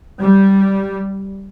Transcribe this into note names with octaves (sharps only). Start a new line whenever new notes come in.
G3